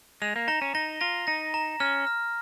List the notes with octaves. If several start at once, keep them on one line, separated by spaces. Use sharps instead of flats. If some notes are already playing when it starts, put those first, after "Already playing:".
G#3 F7
A#3
D#4 A#5
C#4
D#4 A#6
F4 A#6
D#4 A#6
A#5
C#4 F6
F6